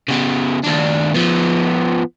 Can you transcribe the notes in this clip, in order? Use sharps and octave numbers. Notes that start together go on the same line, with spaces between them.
C#3 B3
D#2 D4
F3 B3